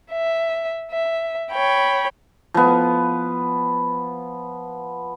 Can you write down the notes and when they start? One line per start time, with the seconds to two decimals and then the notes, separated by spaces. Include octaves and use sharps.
0.12 E5
0.91 E5
1.53 C#5 G5 B5
2.54 F3 B3